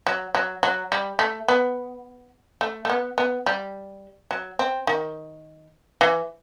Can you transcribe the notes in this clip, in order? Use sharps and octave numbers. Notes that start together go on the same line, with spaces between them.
F#3
F#3
F#3
G3
A3
B3
A3
A3
B3
B3
G3
F#3
C4
D#3
E3